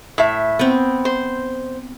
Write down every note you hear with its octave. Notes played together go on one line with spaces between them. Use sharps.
A2 E5
B3 C4
C5